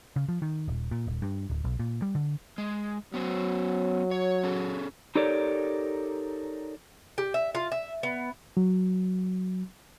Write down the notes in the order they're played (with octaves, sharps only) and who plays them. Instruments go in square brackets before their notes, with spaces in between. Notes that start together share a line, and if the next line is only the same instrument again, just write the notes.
[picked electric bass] C#3
F3
D#3
D#1
A#2
D#1
G2
D1
B1
A#2
G3
D3
[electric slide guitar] G#3
[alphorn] F#3 [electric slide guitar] B3 C#4 C5
[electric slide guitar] C#5
C#4 G#4 A4
D#4 G4 A4 A#4 C#5 D5
[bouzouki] G4
E5
F4
E5
B3
[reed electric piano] F#3